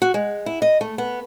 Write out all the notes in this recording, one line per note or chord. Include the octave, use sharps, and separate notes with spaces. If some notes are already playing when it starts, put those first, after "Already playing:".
F#4
G#3
E4
D#5
A3
B3